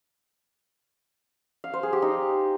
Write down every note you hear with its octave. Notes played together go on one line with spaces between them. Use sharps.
F5
C5
G#4
G4
D#4